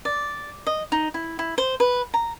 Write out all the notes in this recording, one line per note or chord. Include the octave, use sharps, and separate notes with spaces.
D5
D#5
D#4
E4
E4
C5
B4
A#5